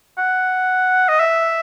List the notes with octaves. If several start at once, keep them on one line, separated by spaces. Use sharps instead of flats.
F#5
D#5
E5